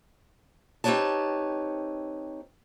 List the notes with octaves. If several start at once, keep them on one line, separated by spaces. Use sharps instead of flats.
C4 D#4 G4 B4 C#5 A5